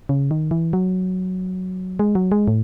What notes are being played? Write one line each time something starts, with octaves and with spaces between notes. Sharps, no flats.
C#3
D#3
E3
F#3
G#3
F#3
G#3
A2